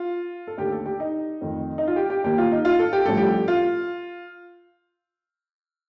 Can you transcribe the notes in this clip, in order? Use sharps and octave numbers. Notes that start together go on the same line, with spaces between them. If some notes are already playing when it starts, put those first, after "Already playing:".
Already playing: F4
A4
D#2 D3 A3 G4
A4
G4
D#4
F2 D#3 A3
D#4
F4
G4
G4
D#2 D#3 A#3 G4
F4
D#4
F4
A4
G4
A1 G2 F3 A3 A4
G4
F4